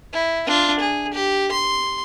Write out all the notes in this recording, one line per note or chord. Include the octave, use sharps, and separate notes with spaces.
E4
D4 F4
G#4
G4
C6